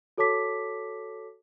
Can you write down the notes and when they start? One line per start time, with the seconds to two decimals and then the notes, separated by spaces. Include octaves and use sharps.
0.18 F#4 A4 C#5 A5 D6 B6